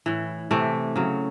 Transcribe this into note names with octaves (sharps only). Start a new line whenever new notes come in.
A2 E3
C3 E3 A3
C#3 F#3